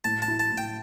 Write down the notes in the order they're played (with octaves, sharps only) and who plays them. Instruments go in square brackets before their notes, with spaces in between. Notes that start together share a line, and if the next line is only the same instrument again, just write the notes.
[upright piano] A2 [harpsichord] A5
[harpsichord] A5
[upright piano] E4
[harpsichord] A5
[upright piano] A2
[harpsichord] G5